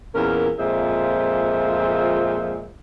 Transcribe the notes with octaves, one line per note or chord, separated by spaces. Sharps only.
E2 A#2 C#4 A#4
F2 A#2 G#3 F4 C5 E5